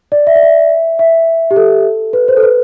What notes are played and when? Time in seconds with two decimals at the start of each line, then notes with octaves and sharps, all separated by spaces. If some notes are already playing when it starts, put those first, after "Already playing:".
0.12 D5
0.27 E5
0.35 D5
0.43 E5
0.99 E5
1.51 G4
1.56 A4
2.13 B4
2.28 C5
2.37 A4
2.43 B4